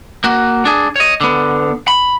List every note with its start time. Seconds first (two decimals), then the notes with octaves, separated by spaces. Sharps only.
0.24 A#3 F#4
0.65 D4 G#4
0.96 C#5 D#5
1.21 D3 B3
1.88 B5